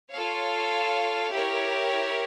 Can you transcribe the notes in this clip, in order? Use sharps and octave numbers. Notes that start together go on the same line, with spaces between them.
F4 A4 C#5 F5
E4 G4 A#4 C#5